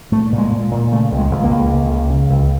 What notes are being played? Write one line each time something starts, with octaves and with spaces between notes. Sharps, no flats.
A#2 A3
A#2
G#3
A#2
A#2
C#3 A3
C#2
G#3
C#2
A#3
C#2
C#3
C#2
C#3
C#2